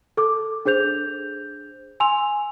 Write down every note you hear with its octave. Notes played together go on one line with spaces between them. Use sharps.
A4 D6
D4 G#4 C5 G6 F7
G#5 C6 E6 F7